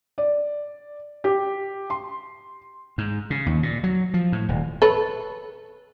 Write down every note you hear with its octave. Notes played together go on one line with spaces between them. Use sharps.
D5
G4
C6
G#2
C#3
D#2
A#2
F#3
F3
A2
D#1
A4 B4 C#5